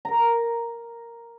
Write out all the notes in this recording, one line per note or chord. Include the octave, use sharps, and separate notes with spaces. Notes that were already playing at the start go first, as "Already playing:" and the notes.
A#4 A#5